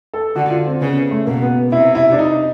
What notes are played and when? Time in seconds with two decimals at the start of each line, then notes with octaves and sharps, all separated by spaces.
0.14 A4
0.36 D3 F#4
0.50 F4
0.66 C4
0.81 C#3 B3
1.11 A3
1.26 B2 A#3
1.42 B3
1.72 C3 E4
1.95 E4
2.12 D4
2.18 D#4